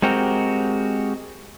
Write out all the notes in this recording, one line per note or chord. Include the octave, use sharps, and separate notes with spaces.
G#3 C4 F#4 G4 A#4